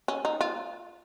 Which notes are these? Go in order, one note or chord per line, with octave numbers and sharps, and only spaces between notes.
C#4
D#4
F4